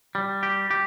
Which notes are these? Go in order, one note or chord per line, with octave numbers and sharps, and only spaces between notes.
G3
G4
G4